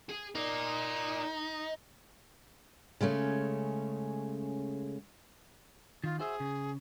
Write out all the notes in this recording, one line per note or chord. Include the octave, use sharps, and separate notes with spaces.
G#4
D#4 A#4 D5
C#3 G#3 A3 C#4
D#3 F4
F#4 G#4 C5 E5
C#3